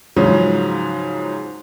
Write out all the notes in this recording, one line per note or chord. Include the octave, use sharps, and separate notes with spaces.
G#2 C#3 F3 F#3 C#4